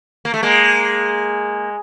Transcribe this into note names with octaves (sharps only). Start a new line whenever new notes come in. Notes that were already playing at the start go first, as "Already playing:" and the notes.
A#3
A3
G#3 A#3